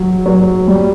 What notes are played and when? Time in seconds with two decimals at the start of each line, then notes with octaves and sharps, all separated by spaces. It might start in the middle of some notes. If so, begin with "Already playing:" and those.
Already playing: F#3
0.26 F#3
0.68 G3